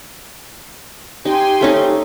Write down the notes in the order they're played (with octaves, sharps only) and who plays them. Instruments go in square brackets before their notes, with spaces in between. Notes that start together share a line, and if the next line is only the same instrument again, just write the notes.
[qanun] D#4 [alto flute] G4 [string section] G5 G#5 C6
[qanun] A3 C#4 D#4